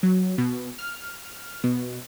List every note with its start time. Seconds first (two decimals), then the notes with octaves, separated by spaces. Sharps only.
0.03 F#3
0.38 B2
0.79 F6
1.64 B2